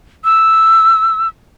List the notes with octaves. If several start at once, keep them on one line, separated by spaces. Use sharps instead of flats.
E6